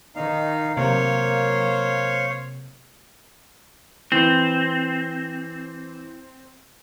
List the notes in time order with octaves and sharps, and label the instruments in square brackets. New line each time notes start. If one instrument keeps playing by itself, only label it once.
[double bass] D#3 [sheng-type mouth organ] D#4 F5
[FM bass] C3 [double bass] F#3 A#3 [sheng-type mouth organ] C5 C#5 F5
[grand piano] E3 [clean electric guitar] C4